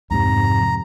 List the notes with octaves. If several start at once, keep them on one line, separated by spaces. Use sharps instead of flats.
F2 G#2 C3 A#5